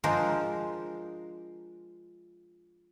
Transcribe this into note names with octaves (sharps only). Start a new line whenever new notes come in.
F3 G#3 D4 A#4 C5